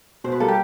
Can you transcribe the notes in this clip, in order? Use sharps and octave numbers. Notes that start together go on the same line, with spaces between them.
B2 C5
B4
G3 A#3 A4
G4